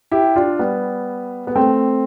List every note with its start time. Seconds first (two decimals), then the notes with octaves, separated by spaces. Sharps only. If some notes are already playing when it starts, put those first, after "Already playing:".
0.12 E4 G4
0.36 D4 F4
0.59 G3 B3
1.47 B3
1.56 A3 C4